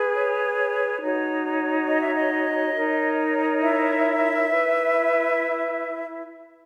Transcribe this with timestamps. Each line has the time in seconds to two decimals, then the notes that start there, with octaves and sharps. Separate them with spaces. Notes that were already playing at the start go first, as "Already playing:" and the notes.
Already playing: G#4 B4
0.14 C#5
1.01 D#4 F#4 C#5
1.88 D#5
2.01 E5
2.15 D#5
2.74 D#4 A#4 C#5
3.61 E4 E5
4.48 E4 B4